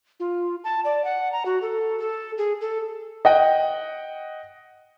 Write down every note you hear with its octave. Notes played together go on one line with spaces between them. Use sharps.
F4
A5
D5
F#5
A#5
F#4
A4
A4
G#4
A4
D#5 F#5 G5